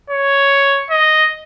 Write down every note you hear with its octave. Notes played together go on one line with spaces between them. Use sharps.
C#5
D#5